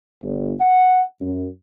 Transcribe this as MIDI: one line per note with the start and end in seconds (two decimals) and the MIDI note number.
0.22 0.52 31
0.60 1.00 78
1.21 1.46 42